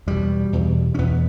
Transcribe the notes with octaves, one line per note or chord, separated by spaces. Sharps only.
E2 B2 G3
E2 B2
C#4
E2 B2 B3